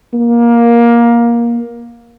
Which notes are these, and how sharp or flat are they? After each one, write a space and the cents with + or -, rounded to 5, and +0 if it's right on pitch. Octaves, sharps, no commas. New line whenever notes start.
A#3 +15